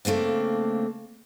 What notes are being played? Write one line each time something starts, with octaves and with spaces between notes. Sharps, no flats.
C#3 A3 A#3 C4 D4